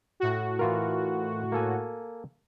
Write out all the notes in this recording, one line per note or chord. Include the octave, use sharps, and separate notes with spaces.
A2 F#4
E3 F4 A#4
A#3 A4 G#5